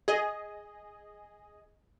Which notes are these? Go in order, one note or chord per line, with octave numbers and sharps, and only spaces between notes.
G#4 D#5